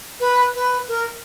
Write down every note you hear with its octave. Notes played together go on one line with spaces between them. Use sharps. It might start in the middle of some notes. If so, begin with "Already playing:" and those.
B4
B4
A#4